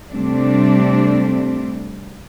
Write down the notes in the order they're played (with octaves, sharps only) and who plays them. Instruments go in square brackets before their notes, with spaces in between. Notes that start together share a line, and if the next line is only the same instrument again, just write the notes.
[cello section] C3 G3 A3 C4 D4